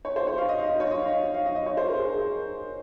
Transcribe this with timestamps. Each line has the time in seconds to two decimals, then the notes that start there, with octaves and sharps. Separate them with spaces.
0.05 C#5
0.16 C5
0.27 C#5
0.38 F5
0.49 D#5
0.59 F5
0.70 D#5
0.80 C#5
0.91 D#5
1.02 F5
1.12 F5
1.34 F5
1.45 D#5
1.55 D#5
1.66 C#5
1.77 C5
1.88 A#4
1.99 G#4
2.10 A#4